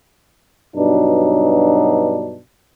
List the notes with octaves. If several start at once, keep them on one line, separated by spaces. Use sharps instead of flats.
G2 B2 F#3 D4 D#4